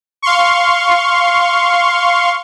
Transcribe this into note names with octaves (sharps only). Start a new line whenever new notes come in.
F5 C6 C#6